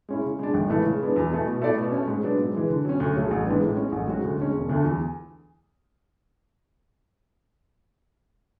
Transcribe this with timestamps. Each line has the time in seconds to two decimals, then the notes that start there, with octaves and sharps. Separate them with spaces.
0.09 G#3 C#4 E4
0.24 C#3
0.39 G#3 D4
0.54 G#1
0.70 G#2 E3 A3 E4
0.85 C#3
1.01 G#3 B3 D4
1.16 E2
1.31 B2 A3 E4
1.46 B2
1.62 A3 E4 A4 D5
1.77 B2
1.92 A3 C#4
2.08 G#2
2.23 F#3 B3 D4
2.38 G#2
2.54 E3 G#3
2.69 D3
2.85 F#3 C#4
3.00 D2
3.15 C#3 F#3 A3
3.31 A1
3.46 G#2 E3 B3 D4
3.61 A2
3.77 G#3 C#4
3.92 A1
4.08 G#2 F#3 C#4 F#4
4.23 D2
4.38 D3 G#3 C#4
4.53 E1
4.69 D2 D3 A3
4.84 E2